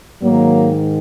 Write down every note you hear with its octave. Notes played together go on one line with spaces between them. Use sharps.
G#2 D#3 F#3 A#3